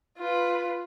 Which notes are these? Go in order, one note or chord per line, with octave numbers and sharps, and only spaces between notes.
F4 B4